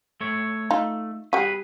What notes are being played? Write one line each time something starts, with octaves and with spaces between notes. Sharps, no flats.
A3 C#5
A3 D#4 F4
G3 F#4 G#4 B4